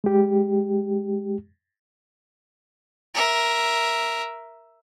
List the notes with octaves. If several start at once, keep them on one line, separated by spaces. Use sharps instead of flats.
G#3 G4
A#4 E5